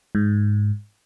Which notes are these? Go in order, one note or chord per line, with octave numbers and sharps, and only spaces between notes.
G#2